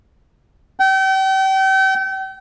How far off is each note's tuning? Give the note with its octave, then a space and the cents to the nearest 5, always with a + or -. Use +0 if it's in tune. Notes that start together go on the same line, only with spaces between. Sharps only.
G5 -35